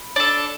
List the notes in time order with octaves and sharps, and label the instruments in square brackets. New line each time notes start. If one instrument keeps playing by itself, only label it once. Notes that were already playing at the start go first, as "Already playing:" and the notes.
Already playing: [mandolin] B5
D4 A4